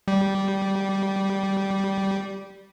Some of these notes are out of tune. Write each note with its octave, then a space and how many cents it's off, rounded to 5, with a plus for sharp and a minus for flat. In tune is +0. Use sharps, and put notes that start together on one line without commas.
G3 -10